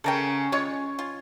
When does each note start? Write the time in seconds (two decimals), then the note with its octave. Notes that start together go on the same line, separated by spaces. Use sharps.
0.04 C#3 C#4 A4 A#4 G5
0.52 G#3 F4 C#5
0.99 F4